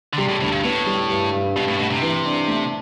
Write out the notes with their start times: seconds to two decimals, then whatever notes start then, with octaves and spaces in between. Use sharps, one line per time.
0.13 D3
0.17 C3 G3
0.29 A2
0.40 D2 A2
0.52 G2
0.64 A2 B3
0.86 G3
1.10 G2
1.33 G2
1.56 G2 B2
1.68 A2
1.79 B2 A3
1.90 C3
2.02 E3
2.26 D4
2.48 A3